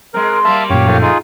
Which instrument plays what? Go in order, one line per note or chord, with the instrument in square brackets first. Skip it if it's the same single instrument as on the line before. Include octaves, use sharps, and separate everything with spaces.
[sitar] G#3 C4 [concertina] A#4
[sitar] G3 A#3 [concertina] E5 F5 A5
[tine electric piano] F#2 A#2 [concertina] G4 C#5 F5
[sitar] D#3 F3 A3
[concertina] D#4 F4 G#4